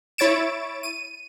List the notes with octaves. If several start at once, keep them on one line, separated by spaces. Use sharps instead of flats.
E4 C#5 A6 D7 E7
D#7